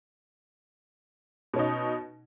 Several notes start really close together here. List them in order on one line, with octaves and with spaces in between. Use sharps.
B2 C#4 D#4